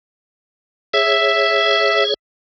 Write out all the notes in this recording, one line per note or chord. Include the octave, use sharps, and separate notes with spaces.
G#4 C#5 E5